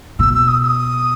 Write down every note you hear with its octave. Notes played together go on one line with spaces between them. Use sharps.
B2 E6
E6
D#6
E6
D#6